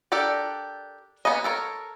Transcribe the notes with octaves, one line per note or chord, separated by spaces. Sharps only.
D4 G4 A4 A#4 D5
A#3 B3 C#4 F#4 D#5
A4 A#4 C5 C#5